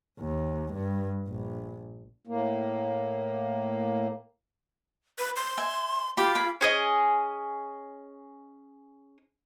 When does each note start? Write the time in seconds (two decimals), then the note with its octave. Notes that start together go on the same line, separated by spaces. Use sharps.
0.20 D#2
0.73 G2
1.27 A#1
2.27 A2 A#3
5.19 B4
5.36 C6
5.58 E5 G#5
6.17 F4 G4 B5
6.35 G#4 B5 D6
6.61 C#4 G#4 D#5